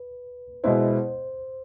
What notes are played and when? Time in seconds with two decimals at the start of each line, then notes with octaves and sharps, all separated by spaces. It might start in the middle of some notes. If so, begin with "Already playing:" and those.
Already playing: B4
0.64 B2 G#3 B3 E4 C5